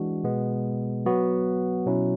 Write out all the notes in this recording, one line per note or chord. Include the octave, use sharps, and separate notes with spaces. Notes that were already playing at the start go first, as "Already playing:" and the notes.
Already playing: E3 G#3 D4 F#4
B2 G#3 B3
F#3 B3 F#4
B2 F#3 C#4 E4